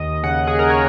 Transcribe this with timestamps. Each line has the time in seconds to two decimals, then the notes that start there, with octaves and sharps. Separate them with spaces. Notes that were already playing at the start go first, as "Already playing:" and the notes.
Already playing: D#2 D#5
0.23 C#3 F#5
0.47 G#4
0.59 A#4
0.70 C#5